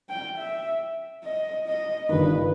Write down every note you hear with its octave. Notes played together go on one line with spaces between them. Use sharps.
G5
E5
D#5
D#5
G1 G2 D#3 B4